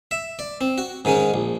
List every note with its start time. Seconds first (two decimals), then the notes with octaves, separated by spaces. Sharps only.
0.11 E5
0.39 D5
0.61 C4
0.78 F#4
1.05 G#2 D#3 G#3 C#4
1.34 A#1